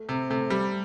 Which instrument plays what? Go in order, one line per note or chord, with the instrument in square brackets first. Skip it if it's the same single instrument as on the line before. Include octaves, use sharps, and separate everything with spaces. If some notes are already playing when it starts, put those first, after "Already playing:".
Already playing: [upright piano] A3
[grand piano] C3
[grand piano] C3 [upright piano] A3
[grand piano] G3